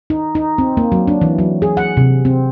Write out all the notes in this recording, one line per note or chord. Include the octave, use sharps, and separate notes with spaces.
D#4
D#4
C4
A#3
F#3
D4
E3
F#3
G#4
F#5
C3
C4